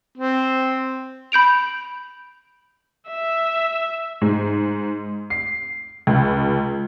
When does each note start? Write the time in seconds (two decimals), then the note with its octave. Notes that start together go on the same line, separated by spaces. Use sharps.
0.17 C4
1.32 B5 G6 D7 F7
3.08 E5
4.22 G#2
5.30 C7
6.07 C#2